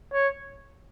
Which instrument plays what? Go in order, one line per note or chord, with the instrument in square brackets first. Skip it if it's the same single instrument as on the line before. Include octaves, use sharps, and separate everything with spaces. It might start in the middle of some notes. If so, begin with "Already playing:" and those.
[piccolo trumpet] C#5